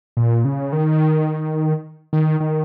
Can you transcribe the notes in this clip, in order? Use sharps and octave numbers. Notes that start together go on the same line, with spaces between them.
A#2
C#3
D#3
D#3
D#3